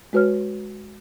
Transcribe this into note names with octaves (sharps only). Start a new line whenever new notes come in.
G#3 F#4 B4 C#5 F6